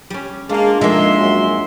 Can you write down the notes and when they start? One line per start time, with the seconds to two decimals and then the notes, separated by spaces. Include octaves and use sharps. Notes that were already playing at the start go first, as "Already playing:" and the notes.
0.10 G3 C#4
0.49 G#3 A#3 D4 F4
0.81 F2 G#3 A#3 D#4 E5 C6
1.19 F#2